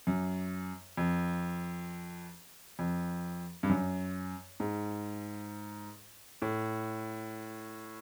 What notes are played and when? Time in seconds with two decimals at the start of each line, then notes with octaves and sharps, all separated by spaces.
0.07 F#2
0.97 F2
2.79 F2
3.63 G2
3.69 F#2
4.60 G#2
6.42 A2